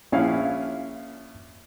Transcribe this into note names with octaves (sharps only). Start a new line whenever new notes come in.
A#1 C#4 E4 F5